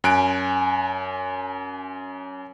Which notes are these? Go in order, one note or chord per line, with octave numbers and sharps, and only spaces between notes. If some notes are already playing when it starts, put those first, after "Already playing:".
F#2 G#5 F#6 D7